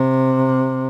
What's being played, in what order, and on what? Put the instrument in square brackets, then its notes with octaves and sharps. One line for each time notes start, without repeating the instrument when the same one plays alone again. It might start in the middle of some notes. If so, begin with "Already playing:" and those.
Already playing: [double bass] C3